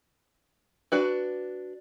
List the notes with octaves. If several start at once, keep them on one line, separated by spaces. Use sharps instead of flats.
D4 F#4 B4